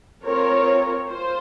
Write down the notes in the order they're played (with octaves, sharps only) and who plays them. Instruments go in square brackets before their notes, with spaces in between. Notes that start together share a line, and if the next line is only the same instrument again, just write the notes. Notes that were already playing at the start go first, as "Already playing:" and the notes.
[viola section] C4 F4 A#4 C#5
F4 C5